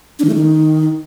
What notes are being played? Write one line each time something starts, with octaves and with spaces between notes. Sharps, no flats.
D4
D#3
A3
D#3